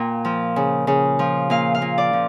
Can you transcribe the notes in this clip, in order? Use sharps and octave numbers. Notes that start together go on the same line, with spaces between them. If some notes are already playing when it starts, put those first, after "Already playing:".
Already playing: A#2 G5
F3
C#3
C#3
F3
A#2 F5
F5
A#2
D5
F3